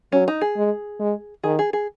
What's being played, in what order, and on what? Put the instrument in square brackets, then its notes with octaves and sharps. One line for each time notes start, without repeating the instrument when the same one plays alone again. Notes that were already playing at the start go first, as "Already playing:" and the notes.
[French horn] F#3 [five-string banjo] C#4
[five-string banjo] D#4
G#4
[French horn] G#3
G#3
[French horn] D#3 [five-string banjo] G#4
[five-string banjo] G#4
G#4